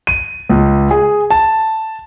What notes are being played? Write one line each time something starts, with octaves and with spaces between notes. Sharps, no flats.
D#7
C#2
G#4
A5